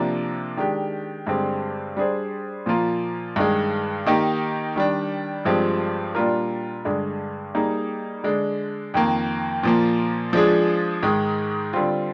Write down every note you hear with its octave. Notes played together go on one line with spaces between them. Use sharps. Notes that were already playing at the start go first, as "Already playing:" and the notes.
Already playing: C3 F3 A#3 D4
D#3 G#3 D4 G4
G2 D3 G#3 C4 G4
G3 D4 G#4 C5
A#2 F3 A#3 F4
G2 D#3 G#3
D#3 A#3 D#4 G4
D#3 G3 D4
G2 F3 G#3 C4 G4
A#2 G3 D4 F4 A#4
G2 D3 G#3
G3 A#3 D#4 G#4
D3 G#3 D4
F2 D#3 A#3
A#2 F3 A#3
F3 G#3 D4 G#4
G#2 D#3 G#3
D3 G3 C4 F4